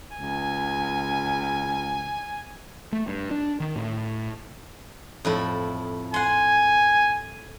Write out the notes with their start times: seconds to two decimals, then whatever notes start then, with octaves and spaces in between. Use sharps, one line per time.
0.13 C#2 G#5
2.92 A3
3.07 G2
3.31 D4
3.60 D#3
3.76 A2
5.25 F2 A2 E4
6.14 F#5 G#5 C6